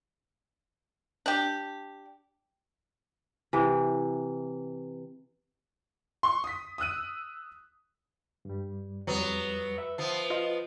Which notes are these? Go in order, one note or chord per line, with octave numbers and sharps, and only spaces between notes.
D4 G4
C3 E3
C6 C#6
D#6 B6
D#6 E6 F#6 D#7
G2 G3
F2 F#3 G3 B3
B4 E5
F3 B3
F4 D#5